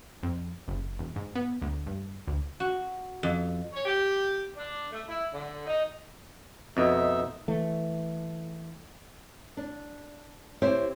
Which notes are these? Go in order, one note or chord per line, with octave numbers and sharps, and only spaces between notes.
F2
F#1
E1
G#2
B3
D2
G2
D2
F#4
F2
C#5
G4
D4
A3
E4
D3
D#4
F2 B2 D#4 E5
E3 A3
D4
C4 E4 G4 C5 C#5 E5